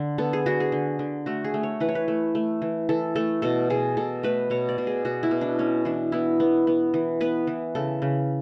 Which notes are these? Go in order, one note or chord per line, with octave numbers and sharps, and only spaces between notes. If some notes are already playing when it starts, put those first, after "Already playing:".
Already playing: D3
B3 A4
G#4
D3 F#4
G#4
D3
D3
A3 F#4
G#4
A3
C#5
E3 B4
C#5
B4
A3
A3
E3
E3 A4
A3 A4
B2 A4
B2 G#4
B2 A4
A3 B4
B2 C#5
D5
B2
G#4
B2 F#4
E4
B2
D4
B3 C#4
E3 D4
B3 E4
B3
B3
E3
B3 B4
E3
C#3 A4
C#3